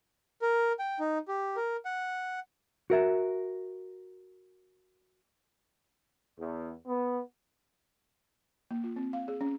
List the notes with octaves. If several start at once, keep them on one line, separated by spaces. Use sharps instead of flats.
A#4
G5
D#4
G4
A#4
F#5
F#4 A#4 E5
E2
B3
A#3
F4
C4
F5
G#4
C#4